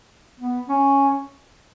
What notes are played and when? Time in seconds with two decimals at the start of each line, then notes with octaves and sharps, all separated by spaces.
0.40 B3
0.69 C#4